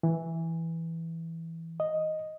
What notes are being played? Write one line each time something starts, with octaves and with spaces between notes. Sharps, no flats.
E3
D#5